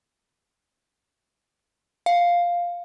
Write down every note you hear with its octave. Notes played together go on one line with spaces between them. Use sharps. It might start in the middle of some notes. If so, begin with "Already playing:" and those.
F5